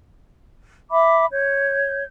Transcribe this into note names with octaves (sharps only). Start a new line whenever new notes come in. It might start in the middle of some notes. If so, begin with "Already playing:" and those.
E5 B5 D6
C#5 G6